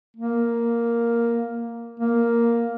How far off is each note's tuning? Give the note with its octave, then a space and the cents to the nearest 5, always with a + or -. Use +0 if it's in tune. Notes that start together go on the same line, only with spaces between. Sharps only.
A#3 +0
A#3 +0